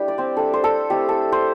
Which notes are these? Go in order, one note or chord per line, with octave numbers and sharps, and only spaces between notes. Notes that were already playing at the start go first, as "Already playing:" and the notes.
Already playing: G3 A3 D4 E4 G4
D5
C4 C5
G3 D4 A4
C5
A4
A3 C4 E4 G4
A4
C5